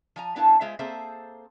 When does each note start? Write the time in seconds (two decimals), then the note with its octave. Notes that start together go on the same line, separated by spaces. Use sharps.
0.16 F3 G#5 A#5
0.36 B3 D4 E4 A#4 F5 A5
0.61 G#3 F4 G#4 C5 E5
0.79 A#3 C4 G#4 A4 C5 E5